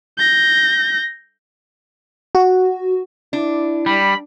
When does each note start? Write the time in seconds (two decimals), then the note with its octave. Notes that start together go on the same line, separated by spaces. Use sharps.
0.18 G6 A#6
2.35 F#4
3.33 D4 E4
3.86 G3 B5